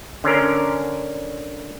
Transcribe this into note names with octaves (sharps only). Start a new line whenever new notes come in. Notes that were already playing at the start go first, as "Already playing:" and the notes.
D3 C#4 A#4